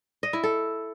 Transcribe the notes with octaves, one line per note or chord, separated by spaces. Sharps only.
D#5
E4
A4